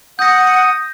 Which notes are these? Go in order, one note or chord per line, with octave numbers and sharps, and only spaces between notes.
F#5 D#6 G6 A#6